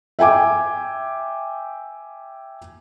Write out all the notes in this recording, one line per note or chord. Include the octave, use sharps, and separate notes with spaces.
E5 G5 G#5 D6